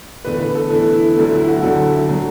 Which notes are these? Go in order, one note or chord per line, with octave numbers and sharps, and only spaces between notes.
E2 D3 A3 B4
B4
A4
E2 D3 A3 E4
E4
D2 D3 F#3 A3
E4
F#4
D2 D3 F#3 A3 A4
D3 F#3 A3